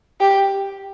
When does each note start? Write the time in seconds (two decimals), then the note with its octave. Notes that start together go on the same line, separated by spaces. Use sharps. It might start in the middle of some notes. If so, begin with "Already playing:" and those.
0.21 G4